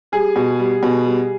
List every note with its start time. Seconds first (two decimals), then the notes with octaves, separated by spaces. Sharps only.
0.12 G3 G#4
0.36 B2
0.59 G3
0.83 B2
1.06 G3